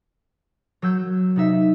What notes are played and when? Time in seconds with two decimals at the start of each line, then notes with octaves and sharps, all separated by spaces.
0.82 F#3 E6 G6
1.36 C3 D#4 E5